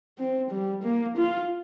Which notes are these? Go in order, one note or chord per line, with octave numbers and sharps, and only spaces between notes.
C4
G3
A#3
F4